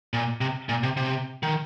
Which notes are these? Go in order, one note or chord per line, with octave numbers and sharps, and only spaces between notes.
A#2
C3
A#2
C3
C3
D#3